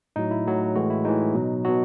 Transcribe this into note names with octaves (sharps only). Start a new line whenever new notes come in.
A2 F#3 D#4
E4
A2 F#3
A2 E3 G#3 F#4
E4
A2 E3 G#3 D#4
B2 F#3
B2 F#3 F#4